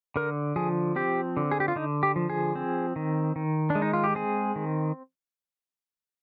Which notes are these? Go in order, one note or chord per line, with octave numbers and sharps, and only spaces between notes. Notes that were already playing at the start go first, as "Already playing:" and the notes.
D3 A#4
F3 G#4
C4 G4
D3
G#4
G4
F4
D3 D#4
G4
F3
G#4
C4
D#3
D#3
D4
G#3
D#4
F4
G4
C4 G#4
D#3